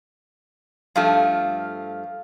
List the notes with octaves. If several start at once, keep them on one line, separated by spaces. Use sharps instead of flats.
G2 F3 A3 F5